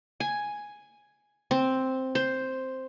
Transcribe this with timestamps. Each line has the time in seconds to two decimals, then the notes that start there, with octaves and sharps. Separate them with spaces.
0.20 G#5
1.51 C4
2.15 C5